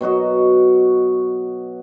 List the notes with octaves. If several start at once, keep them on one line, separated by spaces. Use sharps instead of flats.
B2 F#3 F#4 D#5